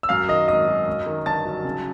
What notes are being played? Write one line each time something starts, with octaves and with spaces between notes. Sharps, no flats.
E6
F#2 F5 F6
D#3 D#5 D#6
G#1 D#5 D#6
F#3
F#2
D#3
G1 A5 A6
F#3
C#3